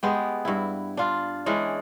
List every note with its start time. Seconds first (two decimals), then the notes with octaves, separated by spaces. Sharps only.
0.03 G#3 B3 G4
0.45 G2 E4
0.97 D4 F4
1.46 E3 G#3 C#4 D4